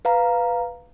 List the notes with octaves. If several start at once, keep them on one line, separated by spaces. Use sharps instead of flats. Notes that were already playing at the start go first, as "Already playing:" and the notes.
B4 F5 A#5